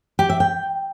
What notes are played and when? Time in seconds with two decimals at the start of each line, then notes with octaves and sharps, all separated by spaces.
0.19 G4
0.29 E5
0.40 G5